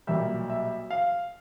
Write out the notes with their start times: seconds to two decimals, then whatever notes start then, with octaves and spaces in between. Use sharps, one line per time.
0.07 B1 A#2 G3 E5
0.50 E5
0.90 F5